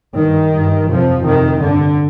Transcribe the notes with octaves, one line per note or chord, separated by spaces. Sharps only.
G2 D#3
G2
F2 C3 F3
F2 C3 D#3
G2 D3